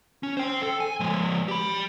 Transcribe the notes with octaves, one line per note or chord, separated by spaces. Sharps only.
C#4
C5 G5
A4
G#5
F3 G#3
G4 B5